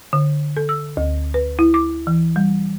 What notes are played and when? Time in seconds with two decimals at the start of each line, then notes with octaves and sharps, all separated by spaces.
0.13 D3
0.57 A4
0.69 E6
0.97 D2
1.34 B4
1.59 E4
1.74 D6
2.07 E3
2.36 G3